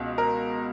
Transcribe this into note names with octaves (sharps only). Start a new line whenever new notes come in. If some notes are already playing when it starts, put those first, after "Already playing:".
Already playing: C#2 B2
A#4